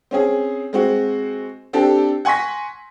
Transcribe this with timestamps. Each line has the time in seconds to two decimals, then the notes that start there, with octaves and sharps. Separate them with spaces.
0.11 C4 C#4 G#4
0.73 G#3 C4 F#4
1.73 C4 D4 G4 A4
2.25 F#5 G#5 C6 C#6 A#6 B6